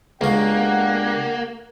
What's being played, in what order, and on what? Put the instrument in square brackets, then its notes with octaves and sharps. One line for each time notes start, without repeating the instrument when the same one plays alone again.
[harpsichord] C#2 F5 [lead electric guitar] A#3 [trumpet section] D4 G4 F#5